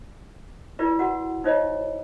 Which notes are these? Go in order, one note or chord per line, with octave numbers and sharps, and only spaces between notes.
E4 F4 G4 A#4 B4 D5
F#4 A#4 F#5
D#4 F4 C5 C#5 D#5